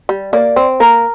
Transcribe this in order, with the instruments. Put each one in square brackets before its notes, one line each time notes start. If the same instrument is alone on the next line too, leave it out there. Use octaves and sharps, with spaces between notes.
[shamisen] G3
[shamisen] A#3 [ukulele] D5
[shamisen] C4
[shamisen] A#3 [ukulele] A#4